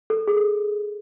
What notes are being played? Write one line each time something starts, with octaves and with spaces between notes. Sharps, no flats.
A4
G#4
A4